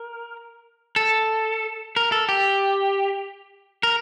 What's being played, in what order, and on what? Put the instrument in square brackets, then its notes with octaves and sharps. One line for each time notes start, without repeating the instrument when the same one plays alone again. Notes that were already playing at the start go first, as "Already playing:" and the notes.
Already playing: [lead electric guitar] A#4
A4
A#4
A4
G4
A#4